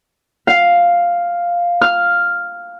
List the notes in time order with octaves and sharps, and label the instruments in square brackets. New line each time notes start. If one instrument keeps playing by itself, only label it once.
[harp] F5
F6